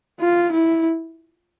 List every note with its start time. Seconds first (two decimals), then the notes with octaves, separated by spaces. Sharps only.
0.20 F4
0.51 E4